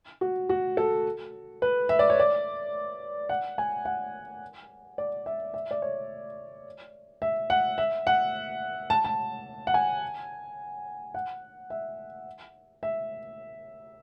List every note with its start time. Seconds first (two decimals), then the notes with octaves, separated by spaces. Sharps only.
0.21 F#4
0.49 F#4
0.77 A4
1.62 B4
1.89 E5
1.99 D5
2.10 C#5
2.20 D5
3.29 F#5
3.58 G#5
3.85 F#5
4.98 D5
5.26 E5
5.54 E5
5.71 D5
5.82 C#5
7.22 E5
7.50 F#5
7.78 E5
8.07 F#5
8.90 A5
9.04 A5
9.67 F#5
9.74 G#5
11.14 F#5
11.70 E5
12.83 E5